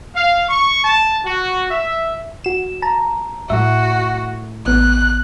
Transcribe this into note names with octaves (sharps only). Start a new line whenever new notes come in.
F5
C#6
A5
F#4
E5
F#4 E7
A5 A#5
A2 A3 F#4 E5
A1 B3 F#6